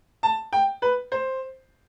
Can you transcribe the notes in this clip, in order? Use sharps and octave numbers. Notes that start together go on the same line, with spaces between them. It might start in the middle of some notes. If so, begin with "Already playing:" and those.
A5
G5
B4
C5